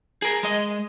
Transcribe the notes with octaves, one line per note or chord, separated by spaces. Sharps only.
G#4 A#4
G#3 D#5